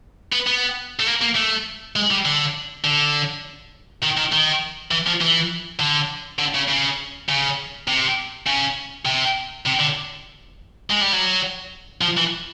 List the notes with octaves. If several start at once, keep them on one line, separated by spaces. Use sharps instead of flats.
B3
B3
A3
A#3
A#3
A3
G#3
G3
D3
D3
D#3
D#3
D#3
E3
F3
E3
D3
D3
C#3
C#3
C#3
C3
C#3
C3
C3
D3
G#3
G3
F#3
F3
E3